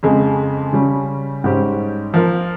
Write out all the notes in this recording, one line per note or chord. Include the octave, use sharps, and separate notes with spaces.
F2 C#3 G#3
C#3 G3 C#4
G#2 G3 C#4 G4 C5
F3 A#3 F4 A#4